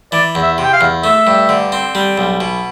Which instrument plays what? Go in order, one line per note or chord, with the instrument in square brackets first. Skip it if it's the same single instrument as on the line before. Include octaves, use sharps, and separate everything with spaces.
[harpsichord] E3 [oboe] D5
[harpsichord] E2
[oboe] E5
[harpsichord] C3
[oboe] G5
F5
[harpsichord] E2
[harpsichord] A3 [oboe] E5
[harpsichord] G2
D3
C4
G3
B1
B2